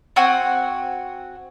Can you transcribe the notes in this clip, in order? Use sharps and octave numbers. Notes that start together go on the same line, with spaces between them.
C4 F#4 F#5 G#5